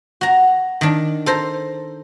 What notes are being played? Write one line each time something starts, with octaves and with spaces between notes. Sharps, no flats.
F#4 A#5
D#3 D4
A4 C5 A#5